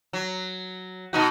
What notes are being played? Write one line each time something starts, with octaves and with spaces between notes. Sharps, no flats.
F#3
B2 D#4 F#4